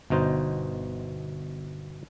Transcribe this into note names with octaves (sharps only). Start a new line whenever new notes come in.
G1 B2 D#4 C5